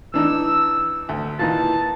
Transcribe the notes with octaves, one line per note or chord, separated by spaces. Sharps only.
E3 D4 D#4 E6
D2
A#2 E3 D#4 A5